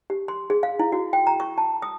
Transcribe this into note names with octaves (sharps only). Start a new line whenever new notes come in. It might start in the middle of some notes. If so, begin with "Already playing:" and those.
G4
C6
G#4
F5
E4
F#4
G5
A#5
C#6
A5
D#6